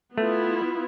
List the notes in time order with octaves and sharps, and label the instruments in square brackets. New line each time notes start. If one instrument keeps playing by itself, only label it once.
[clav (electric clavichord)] A3 [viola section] B3 E4 F4